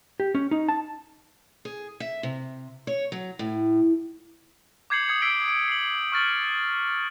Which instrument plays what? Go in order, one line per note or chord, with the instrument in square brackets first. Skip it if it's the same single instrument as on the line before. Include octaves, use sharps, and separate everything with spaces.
[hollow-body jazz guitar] G4
C#4
D#4
A5
[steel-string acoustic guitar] G#4
E5
C3
C#5
F#3
A2
[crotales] D6 G6 G#6 C7 C#7 F#7
D#6 G#6 C#7
E6 B6 C7 D7 G7
D7
C7 F#7
C#6 F6 A6 F#7